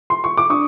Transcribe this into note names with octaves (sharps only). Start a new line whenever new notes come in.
C6
C#6
D6
D4 C#6 D#6